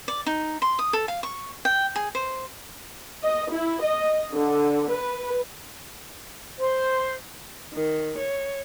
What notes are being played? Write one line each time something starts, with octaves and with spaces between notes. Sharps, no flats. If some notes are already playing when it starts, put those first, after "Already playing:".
D5
D#4
C6
D#6
A4
F5
C#6
G5
G#4
C5
D#5
E4
D#5
D3
B4
C5
D#3
C#5